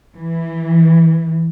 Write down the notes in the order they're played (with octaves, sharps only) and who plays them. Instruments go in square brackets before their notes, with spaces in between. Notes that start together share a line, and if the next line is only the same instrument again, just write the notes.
[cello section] E3